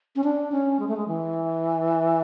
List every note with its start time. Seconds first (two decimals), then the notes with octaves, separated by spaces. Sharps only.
0.16 C#4
0.24 D4
0.52 C#4
0.80 G#3
0.88 A3
0.97 G#3
1.08 E3